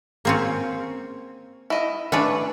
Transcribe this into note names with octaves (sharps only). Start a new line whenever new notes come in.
A#3 C4 C#4
E4 D#5
E3 A3 C#4 D4 B4 D5